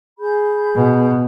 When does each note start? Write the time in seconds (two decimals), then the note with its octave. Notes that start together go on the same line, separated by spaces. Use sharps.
0.19 G#4 B5 G6
0.75 B2